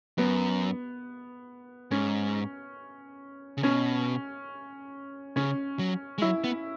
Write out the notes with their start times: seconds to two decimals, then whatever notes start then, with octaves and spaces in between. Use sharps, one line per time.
0.18 F#2 B3
1.91 G#2 C#4
3.57 C#3
3.63 B2 C#4
5.36 C#3 C#4
5.79 F#3
6.18 G#3
6.22 F#3 E4
6.44 B3